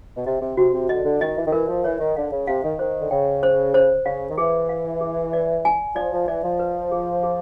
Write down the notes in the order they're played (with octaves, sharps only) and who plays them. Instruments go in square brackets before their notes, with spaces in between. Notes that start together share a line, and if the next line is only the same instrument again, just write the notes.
[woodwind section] B2
[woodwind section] C3 [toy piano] D#5
[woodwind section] C3
[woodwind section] C3 [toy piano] F#4
[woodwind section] C3
[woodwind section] D3 [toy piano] D#5
[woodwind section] D3
[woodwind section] D#3 [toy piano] D#5
[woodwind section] E3
D#3
[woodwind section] E3 [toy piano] A#4
[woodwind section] F3
[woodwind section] E3 [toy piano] C#5
[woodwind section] D#3
[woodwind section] D3 [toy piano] F5
[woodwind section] C#3
[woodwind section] C3 [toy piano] F5
[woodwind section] D#3
[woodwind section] D#3 [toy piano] C5
[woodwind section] D3
[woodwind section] C#3 [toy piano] G5
[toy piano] C5
C5
[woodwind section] C#3 [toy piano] F5
[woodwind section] D#3
[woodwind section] E3 [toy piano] G#4
[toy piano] F5
G#4
D5
G#5
[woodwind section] F3 [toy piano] D5
[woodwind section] F3
[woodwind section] E3 [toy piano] D5
[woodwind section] F3
[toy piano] B4
G#4
G#4